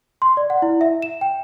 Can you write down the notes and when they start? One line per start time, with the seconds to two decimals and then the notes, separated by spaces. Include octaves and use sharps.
0.22 C6
0.37 D5
0.50 F#5
0.62 E4
0.81 E5
1.02 E7
1.21 G5